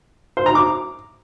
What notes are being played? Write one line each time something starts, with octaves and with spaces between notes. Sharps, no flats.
C5
A#5
D6